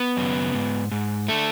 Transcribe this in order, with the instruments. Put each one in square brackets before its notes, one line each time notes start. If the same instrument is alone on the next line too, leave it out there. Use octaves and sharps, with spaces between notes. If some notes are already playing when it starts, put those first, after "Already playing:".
Already playing: [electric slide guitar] B3 B4
F#2 C#3
G#2
G#2
D3 A3 A4